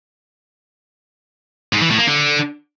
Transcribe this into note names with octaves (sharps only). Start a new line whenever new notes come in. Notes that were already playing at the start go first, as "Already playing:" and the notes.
G#2
E3
A2
A#3
D3